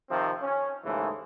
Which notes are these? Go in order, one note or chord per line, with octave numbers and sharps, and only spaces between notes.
C3 D#3 F3 C4
C#4
D#2 G#2 C#3 E3 G#3 A3